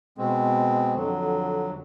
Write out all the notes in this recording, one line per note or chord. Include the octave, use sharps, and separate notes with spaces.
B2 G#3 C4
F2 D3 F#3